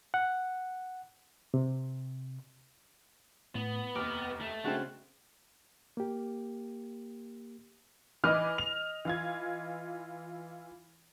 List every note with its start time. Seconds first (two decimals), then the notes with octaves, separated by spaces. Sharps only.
0.14 F#5
1.54 C3
3.55 A2 B3
3.95 F1 D#2 B4 D6 F6
4.41 A3
4.64 C#3 G#3 C4 D4 F#4 F#6
5.97 A#3 G4
8.24 E3 B4 D#5 D6 F6
8.58 F7
9.05 E3 F4 G#6